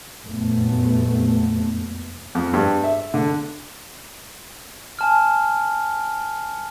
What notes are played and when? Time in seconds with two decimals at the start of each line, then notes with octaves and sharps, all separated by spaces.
0.23 F1 F#2 A#2 A3 B3
2.35 F2
2.54 G2
2.84 E5
3.14 D3
4.99 G#5 A5 F6